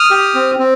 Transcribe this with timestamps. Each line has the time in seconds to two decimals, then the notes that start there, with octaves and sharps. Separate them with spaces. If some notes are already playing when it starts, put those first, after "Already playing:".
Already playing: D#6 F6
0.11 G4
0.34 C4
0.59 C4